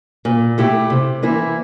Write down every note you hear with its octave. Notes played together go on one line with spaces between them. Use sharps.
A#2
A3 E4 G4
C3
E3 A#3 E4